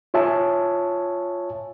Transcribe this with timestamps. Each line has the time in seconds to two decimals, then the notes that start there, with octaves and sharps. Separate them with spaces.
0.14 F4 C#5 E5 G#5 A5